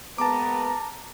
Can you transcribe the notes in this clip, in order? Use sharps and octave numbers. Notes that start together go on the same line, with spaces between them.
G#3 A#3 B3 A5 A#5 D6